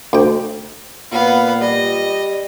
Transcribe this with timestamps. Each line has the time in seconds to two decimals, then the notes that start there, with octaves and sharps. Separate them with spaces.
0.13 D2 G5
1.12 A#2 B3 F5
1.61 G3 D#5